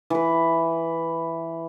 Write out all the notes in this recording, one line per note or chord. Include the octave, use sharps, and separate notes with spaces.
E3 B4